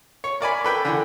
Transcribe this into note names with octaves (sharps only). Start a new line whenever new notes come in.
C#5
A#4 D5 G#5 B5
A4 B4 G5
D3 E3